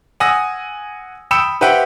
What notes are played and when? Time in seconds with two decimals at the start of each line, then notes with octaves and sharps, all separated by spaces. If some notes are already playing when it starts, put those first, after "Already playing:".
0.20 F#5 G#5 D#6 E6 A#6
1.31 G5 B5 D#6 E6 C#7 E7
1.61 G4 B4 C5 E5 F#5 G5